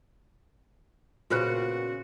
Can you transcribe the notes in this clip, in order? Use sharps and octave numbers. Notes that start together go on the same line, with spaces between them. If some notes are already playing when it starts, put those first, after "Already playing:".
A#2 C#3 B3 F4 F#4 B4 C5